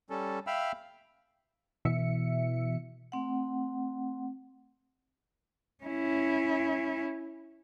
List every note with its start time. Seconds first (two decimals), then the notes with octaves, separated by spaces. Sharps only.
0.10 G3 C#4 A4
0.47 E5 F5 G5 B5 E6 F6
1.85 B2 E3 E5 C#7
3.12 A3 C4 F#5
5.84 C#4 E4